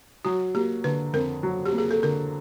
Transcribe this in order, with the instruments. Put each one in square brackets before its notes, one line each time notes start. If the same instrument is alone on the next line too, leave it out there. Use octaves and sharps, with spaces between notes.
[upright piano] F#3 [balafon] F#4
[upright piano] A#3 [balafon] G4
[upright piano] D3 [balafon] B4
[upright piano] F2 [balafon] A#4
[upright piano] F#3
[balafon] G4
[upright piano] A#3
[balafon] G#4
A4
[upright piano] D3 [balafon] A#4